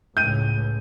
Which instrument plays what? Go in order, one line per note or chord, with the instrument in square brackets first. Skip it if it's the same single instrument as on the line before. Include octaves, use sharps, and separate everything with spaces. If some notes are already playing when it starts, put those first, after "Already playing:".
[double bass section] C#2 A2 C#3 [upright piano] G6 D#7